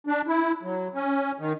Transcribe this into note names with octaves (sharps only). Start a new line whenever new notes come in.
D4
E4
F#3
C#4
D#3